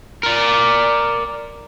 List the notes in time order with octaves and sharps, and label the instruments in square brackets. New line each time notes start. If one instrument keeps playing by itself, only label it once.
[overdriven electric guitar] A#4 D5